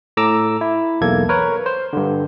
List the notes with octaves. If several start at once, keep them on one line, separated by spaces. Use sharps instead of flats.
A2 A4 A#5 D6 E6
E4
B1 E2 A#3 A4 G#6
A#4 B4 C#5
C5
G2 D3